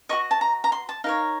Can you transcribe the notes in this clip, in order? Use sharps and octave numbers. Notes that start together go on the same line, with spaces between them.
F#4 A#4 D#5 C#6
A5
A#5
A#5
C6
A5
D#4 A#4 C#5 F5